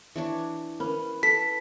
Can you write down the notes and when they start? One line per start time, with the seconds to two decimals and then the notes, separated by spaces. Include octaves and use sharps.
0.16 E3 D4 C#5
0.80 C#4 B4
1.23 A4 B6